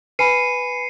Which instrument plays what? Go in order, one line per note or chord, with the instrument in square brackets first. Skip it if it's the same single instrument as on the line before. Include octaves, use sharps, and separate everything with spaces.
[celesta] B4 G#5 B5 [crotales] C7 C#7 D#7